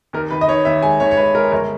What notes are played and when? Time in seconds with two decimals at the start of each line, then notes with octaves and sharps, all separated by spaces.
0.13 D#2 A#4
0.31 D#3 B4
0.41 D#5
0.48 D#3 C#5
0.65 D#2 E5
0.82 G#3 G#5
1.00 D#2 C#5
1.11 C#5
1.17 G#3 B4
1.35 G#3 A#4
1.52 G1 A#4